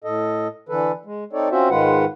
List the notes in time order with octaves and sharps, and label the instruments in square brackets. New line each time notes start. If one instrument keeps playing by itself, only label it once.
[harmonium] A2 A4 D#5
D3 E3 A4 B4
G#3
C4 D#4 A4 C#5 D5
C4 C#4 F4 F#4 C5 E5
G#2 D#3 G#3 F4 B4 F#5